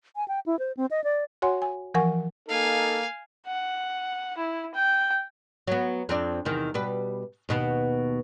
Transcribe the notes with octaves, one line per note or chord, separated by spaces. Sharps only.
G#5
G5
E4
C5
C4
D#5
D5
F#4 C#5 F#5 G#5 C6
G#5
E3 F3 A#4 F#5 G#5 C#6
A#3 D#4 A4 F5 G#5
F#5
E4
G5
F#3 B3
F2 C4 D4
E2 C3 D#3
B2 G3 B4
D#2 B2 B3